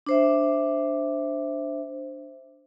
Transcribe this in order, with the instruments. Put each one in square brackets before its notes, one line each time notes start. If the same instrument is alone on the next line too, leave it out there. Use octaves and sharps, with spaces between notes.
[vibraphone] D4 C5 E5